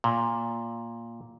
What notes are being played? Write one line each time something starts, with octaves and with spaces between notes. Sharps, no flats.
A#2